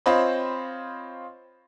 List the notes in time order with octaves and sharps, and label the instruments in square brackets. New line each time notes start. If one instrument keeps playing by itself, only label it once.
[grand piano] C4 F4 C5 C#5 D#5 B5